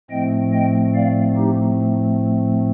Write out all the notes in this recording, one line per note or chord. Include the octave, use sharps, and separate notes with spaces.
A2 F3 A3 C4 D#5 G5
D#5 G5
D5 F5
D#4 G4